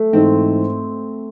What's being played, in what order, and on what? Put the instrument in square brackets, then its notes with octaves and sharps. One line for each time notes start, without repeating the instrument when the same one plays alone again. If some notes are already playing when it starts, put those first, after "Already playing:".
Already playing: [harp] A3
[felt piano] G#2 E3 G#3 D#4 [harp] C4